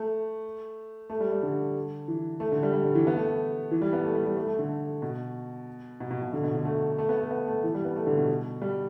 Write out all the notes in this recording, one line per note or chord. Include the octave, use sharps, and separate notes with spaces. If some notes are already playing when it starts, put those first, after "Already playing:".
Already playing: A3
A3
G3
G3
D3
E3
A3
D3
G3
G3
D3
E3
B3
A3
A3
E3
G3
B3
A3
G3
G3
A3
A3
D3
B2
B2
B2
B2
D3
B2
D3
A3
A3
B3
A3
B3
A3
E3
G3
B3
A3
D3
B2
G3